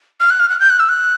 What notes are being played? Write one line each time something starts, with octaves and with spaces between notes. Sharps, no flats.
F6
F#6
F6
F#6
G6
F#6
E6
F#6